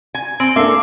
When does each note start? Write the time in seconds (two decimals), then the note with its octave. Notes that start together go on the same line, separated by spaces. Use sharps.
0.15 G#5
0.40 C4 G#5 C6 D7
0.56 A#3 D4 A4 E5 D6 C7